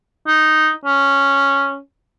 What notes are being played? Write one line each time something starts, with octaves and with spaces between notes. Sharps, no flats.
D#4
C#4